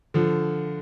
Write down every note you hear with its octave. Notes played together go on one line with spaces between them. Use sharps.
D3 F3